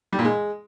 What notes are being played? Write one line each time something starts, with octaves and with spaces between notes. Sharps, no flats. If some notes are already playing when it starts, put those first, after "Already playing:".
G3
A#2
G#3